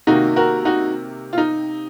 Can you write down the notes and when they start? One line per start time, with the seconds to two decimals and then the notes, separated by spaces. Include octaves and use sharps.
0.07 C3 D#3 A#3 D#4 F#4
0.36 F#4 A#4
0.65 D#4 F#4
1.33 F4
1.38 D#4